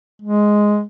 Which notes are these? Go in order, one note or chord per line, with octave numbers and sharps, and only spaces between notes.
G#3